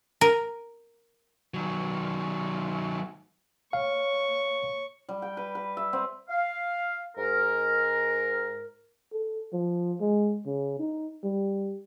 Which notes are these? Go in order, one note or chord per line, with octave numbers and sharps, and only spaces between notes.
A#4
D#3 F#3
C#5 F5 C#6
G3
G5
B4
B4
E5
C4
F5
G#2 A#4
A4
F3
G#3
C#3
D#4
G3